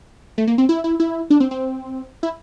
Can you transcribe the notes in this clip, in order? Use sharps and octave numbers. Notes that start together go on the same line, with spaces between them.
A3
A#3
C4
E4
E4
E4
D4
C4
C4
E4